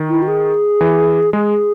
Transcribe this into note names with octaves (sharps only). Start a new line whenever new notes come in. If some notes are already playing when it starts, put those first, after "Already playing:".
Already playing: D#3
E4
F#4
G#4
E3
G#3 G#4